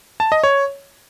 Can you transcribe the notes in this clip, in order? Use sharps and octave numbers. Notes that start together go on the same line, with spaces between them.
A5
D#5
C#5